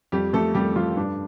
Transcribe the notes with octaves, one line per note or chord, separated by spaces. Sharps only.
F2 G3 G4
F2 A3 A4
F2 G3 G4
F3 G3 F4
G2 D4